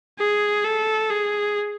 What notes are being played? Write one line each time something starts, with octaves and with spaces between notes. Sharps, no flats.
G#4
A4
G#4